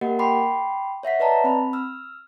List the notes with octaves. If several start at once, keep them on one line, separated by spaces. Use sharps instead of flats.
A#3 G4 A#4 D#5 F#5
G5 B5 C6 D6 C7
C#5 E5 F#5 B6
B4 D5 D#5 A5 A#5
C4 B5
E6 F6